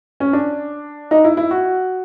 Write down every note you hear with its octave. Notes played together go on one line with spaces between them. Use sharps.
C#4
D4
D#4
E4
E4
F#4